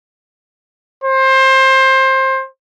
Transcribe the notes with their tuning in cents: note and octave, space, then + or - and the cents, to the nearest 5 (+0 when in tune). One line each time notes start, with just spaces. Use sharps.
C5 +20